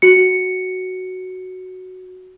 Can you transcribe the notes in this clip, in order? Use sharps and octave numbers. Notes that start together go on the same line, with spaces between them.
F#4 C#7